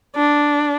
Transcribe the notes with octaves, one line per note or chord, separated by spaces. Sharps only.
D4